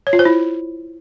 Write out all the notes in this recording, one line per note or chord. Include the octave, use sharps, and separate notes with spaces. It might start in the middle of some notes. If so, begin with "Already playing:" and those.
C#5
F4
C5
E4